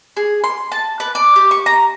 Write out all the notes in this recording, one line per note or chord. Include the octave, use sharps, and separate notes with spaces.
G#4
C6
A5
B4
D5
G4
C#6
A#5